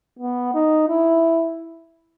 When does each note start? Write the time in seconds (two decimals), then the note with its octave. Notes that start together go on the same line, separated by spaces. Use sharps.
0.19 B3
0.54 D#4
0.89 E4